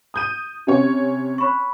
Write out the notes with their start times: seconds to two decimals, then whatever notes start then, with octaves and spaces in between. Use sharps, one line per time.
0.14 D#6 G6 D#7
0.67 C3 C#4 C#5
1.38 C#5 B5 C#6